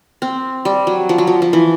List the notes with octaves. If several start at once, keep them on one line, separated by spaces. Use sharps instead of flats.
C4
G3
F#3
F3
F#3
F3
F3
E3